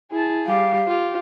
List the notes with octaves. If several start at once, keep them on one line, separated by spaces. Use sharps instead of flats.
E4 G#4 A5
G3 G4 F5
F4 G4